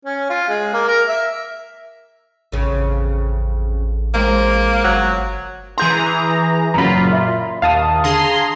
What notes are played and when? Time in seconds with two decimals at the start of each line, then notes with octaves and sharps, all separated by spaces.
0.05 C#4
0.30 F4
0.49 G#3
0.74 A#3
0.88 A#4
1.09 E5
2.52 A1 F2 C#3
4.14 F3 G#3 A#3 C4
4.84 G1 F#3
5.78 E3 G#4 A#5 C6 G6
6.74 F#1 A#2 F#3 F4 A#5 B5
7.13 E5
7.62 D#2 F5 A5 D#6
8.04 D3 G#4 A#5 C6